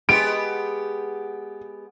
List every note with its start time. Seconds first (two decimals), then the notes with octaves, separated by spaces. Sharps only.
0.09 G#3 B3 G4 D7